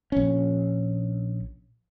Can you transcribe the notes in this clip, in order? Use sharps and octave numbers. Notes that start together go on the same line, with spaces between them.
A#1 C#4